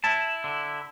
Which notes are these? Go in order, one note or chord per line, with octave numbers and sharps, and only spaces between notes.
E4 A5
D3